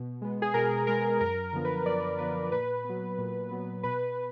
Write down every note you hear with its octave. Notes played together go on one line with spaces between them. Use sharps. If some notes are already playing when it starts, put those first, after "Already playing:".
Already playing: B2
G#3 B3
G#4
B2 A#4
G#3 B3 A#4
F#2 A#4
D3 F3 B3
B4
F#2 D5
D3 F3 B3 B4
A#2 B4
F#3 B3
A#2
F#3 B3
B2 B4